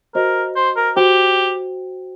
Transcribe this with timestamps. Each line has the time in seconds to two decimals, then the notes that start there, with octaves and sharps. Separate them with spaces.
0.15 F#4 A#4 C5 D#5
0.56 C5
0.76 A#4
0.96 F#4 G4 C5 G5